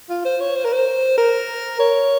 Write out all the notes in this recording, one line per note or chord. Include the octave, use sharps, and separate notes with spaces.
F4
C5
C#5
C5
A#4
C5
A#4
C#5